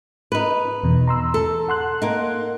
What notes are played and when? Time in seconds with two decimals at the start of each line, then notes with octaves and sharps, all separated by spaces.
0.32 D#4 B4
0.83 E2 B2
1.07 A#5 C6 E6
1.34 A4
1.69 F#5 C6 F#6
2.02 A#3 D#4